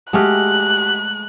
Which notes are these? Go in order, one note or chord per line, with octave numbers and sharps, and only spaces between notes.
G#3 A3 F#4 G4 F6 F#6